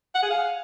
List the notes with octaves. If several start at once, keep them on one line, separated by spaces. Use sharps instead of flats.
F#5
G#4
F5